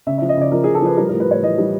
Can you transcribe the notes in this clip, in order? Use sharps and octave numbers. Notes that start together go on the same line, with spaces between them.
C#3 E5
F3 E5
D#5
C#3 D5
F3 A#4
C#3 G#4
A4
F3 B4
G3 A#4
A2 A#4
B4
A2 C#5
E3 D#5
G3